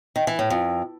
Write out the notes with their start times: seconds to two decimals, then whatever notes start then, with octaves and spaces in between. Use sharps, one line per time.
0.16 D#3
0.27 E3
0.39 A2
0.50 F2